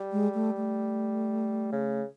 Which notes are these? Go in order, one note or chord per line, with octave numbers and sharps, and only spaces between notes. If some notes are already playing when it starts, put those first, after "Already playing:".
Already playing: G3
G#3
A3
A3
C#3